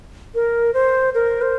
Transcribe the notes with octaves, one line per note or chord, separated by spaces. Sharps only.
A#4
C5
A#4
C5